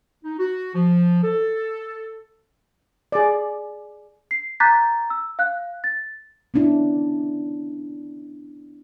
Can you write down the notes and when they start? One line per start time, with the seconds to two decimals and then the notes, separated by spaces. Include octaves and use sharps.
0.24 D#4
0.39 F#4
0.75 F3
1.24 A4
3.12 G#4 D5
4.31 C7
4.60 A#5 D6 F#6 G6 A6 B6
5.10 E6
5.39 F5 F#6
5.84 A6
6.54 B3 C#4 D4 E4